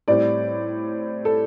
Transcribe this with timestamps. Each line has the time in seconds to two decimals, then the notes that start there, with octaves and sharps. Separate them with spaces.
0.08 A2 G3 C4 D5
1.25 A4